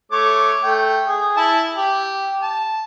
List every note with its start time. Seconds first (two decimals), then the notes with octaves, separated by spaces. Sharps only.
0.12 A3 C#5 D6
0.63 A3 G5
1.07 G#4
1.37 E4 A5
1.77 G4
2.42 A5